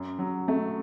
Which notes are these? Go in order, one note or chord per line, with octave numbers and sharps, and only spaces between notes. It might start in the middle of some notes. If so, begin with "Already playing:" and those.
Already playing: F#2
F#3
A3